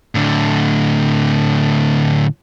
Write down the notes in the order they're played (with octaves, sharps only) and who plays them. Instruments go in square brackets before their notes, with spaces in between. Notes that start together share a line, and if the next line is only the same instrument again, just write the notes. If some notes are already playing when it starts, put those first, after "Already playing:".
[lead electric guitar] A2 D3